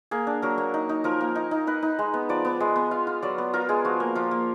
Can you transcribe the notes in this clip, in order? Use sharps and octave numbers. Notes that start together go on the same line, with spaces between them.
A#3 G#4
D4
F#3 A#4
A#3
D#4
D#4
F3 A#4
A#3
D#4
D#4
D#4 B4
D#4
G#3
B3
F3 D5
B3
G#3
B3
F4 F5
F4
F#3 D5
B3
F4 A#4
G#3 G#4
F3 F#4
A#3
F3 F4
A#3